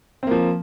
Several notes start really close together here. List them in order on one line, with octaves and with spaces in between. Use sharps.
C4 A#3 F3